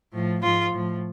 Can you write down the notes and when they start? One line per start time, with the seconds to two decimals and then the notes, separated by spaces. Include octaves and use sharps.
0.13 A2 F3
0.42 G#2 F3 F4
0.71 A2 F3